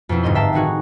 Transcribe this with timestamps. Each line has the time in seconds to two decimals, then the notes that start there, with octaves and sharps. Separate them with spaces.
0.09 F2 B2 C4 E4
0.23 G1 G#2 D#5 C6
0.35 E5 F5 G5 A5 A#5
0.53 A2 D#3 D#4 F#4 G#4